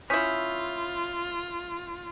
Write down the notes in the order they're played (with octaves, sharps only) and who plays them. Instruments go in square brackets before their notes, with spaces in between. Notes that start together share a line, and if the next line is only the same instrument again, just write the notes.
[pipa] C#4 E4 [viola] F4 [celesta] D#6 G6 B6